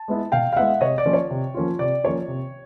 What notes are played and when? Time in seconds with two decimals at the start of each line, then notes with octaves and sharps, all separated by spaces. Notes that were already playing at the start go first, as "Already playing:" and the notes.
Already playing: A5
0.08 G#3 B3 E4
0.32 B2 F5 G5
0.53 F5
0.56 G#3 B3 E4 E5 F#5
0.81 C3 C#5 D#5
0.98 D5
1.06 F3 A#3 C#4 F4
1.13 C#5
1.30 C3
1.54 F3 A#3 C#4 F4
1.79 C3 D5
2.04 F3 A#3 C#4 F4 C#5
2.28 C3